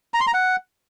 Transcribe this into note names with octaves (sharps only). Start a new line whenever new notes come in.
A#5
C6
A#5
F#5